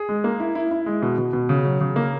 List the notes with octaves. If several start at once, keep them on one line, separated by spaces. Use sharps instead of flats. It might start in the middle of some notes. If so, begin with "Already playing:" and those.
Already playing: G#4
G#3
A#3
E4
E4
E4
G#3
B2
B2
B2
C#3
F#3
C#3
A#3